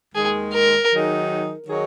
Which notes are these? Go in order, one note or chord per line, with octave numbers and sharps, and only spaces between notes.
D#2 D#3 G#3 G#4
A#4
D#3 F#3 D#4 G#4
D#3 F#3 D#4 G#4